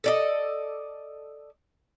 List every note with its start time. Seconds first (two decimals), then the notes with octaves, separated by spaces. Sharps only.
0.04 A4 D5 D#5